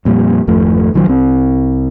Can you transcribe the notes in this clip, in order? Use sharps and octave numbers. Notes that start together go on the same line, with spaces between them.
F2 A#2 G3
G#1 F2 F3 A3
A#1 D#3 F3 F#3
C2 C4